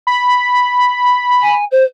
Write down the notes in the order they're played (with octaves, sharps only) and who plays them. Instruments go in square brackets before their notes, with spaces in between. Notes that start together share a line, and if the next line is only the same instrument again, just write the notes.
[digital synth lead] B5
[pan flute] G#5
C5